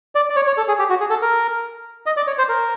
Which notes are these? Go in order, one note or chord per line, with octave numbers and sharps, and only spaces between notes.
D5
D5
C#5
C#5
A4
G#4
G4
F#4
G#4
A4
A#4
D#5
D5
C#5
C5
A#4